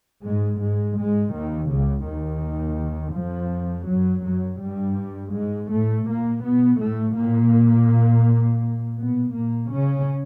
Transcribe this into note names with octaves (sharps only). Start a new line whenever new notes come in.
G#2 G#3
G#2 G#3
G#2 G#3
D#2 D#3
C#2 C#3
D#2 D#3
F2 F3
F#2 F#3
F#2 F#3
G2 G3
G#2 G#3
A2 A3
A#2 A#3
B2 B3
A2 A3
A#2 A#3
B2 B3
A#2 A#3
C#3 C#4